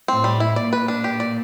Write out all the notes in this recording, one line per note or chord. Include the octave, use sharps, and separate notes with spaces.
A2 C4
G3
E4
A#2 D5
B4
D4
G4
D5